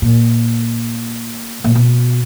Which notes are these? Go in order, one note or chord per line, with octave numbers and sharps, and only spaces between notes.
A#2
A#2
B2